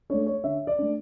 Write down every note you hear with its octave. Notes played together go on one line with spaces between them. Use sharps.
A3 D4 C#5
C#5
D3 E5
D5
A3 D4